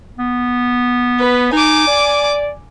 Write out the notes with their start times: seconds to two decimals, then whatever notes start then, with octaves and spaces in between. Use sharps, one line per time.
0.18 B3
1.19 B4
1.53 D#4 G#5 D6
1.87 D5